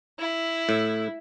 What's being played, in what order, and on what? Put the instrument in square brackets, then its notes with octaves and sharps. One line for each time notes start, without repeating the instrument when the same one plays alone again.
[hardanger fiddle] E4
[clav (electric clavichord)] A2